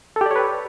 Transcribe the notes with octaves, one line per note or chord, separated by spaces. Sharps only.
G4 A4 B4 C#5 D5